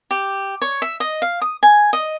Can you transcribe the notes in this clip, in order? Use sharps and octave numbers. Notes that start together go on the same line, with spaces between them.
G4
C#5
E5
D#5
F5
D#6
G#5
D#5